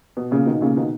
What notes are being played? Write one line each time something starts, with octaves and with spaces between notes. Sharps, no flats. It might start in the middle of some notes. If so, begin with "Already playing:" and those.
B2
A#2 C#3
B2 D#3
A#2 C#3
B2 D#3